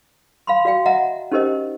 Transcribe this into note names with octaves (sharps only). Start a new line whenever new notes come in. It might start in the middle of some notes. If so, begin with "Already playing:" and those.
F5 B5 C6
F#4 D5 F5 G5
D#5 E5 F#5 A#5
C#4 D#4 G4 A#4 C5 D#5